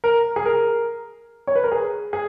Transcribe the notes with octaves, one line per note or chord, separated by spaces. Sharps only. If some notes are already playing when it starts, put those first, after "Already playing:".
A#4
G#4
A#4
C#5
B4
A#4
G#4
G#4